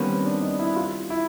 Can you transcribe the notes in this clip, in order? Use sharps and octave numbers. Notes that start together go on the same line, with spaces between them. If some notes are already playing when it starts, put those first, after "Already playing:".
Already playing: D#3 G3 A#3 B3 C#4
C4
D4
D#4
E4
F4
E4